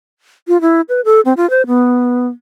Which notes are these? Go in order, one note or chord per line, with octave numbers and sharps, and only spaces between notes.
F4
E4
B4
A4
C4
F4
C5
B3